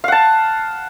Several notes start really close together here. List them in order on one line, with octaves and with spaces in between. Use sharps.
F5 F#5 A5